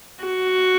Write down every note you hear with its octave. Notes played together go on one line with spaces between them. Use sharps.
F#4